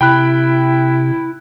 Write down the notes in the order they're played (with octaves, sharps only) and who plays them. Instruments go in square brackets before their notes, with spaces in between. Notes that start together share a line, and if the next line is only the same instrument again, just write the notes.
[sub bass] C3 [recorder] E4 [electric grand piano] G5 B5 F#6